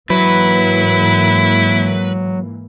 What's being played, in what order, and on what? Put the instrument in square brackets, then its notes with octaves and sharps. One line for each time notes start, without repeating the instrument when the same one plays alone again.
[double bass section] G#2 E3 A#3 [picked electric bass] F#3 [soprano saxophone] E4 [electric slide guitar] B4